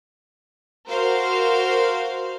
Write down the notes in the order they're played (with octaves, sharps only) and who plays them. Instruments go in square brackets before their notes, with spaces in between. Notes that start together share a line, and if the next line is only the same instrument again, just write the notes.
[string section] F#4 A#4 C5 F5